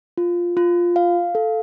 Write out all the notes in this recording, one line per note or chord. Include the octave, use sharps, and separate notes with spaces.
F4
F4
F5
A4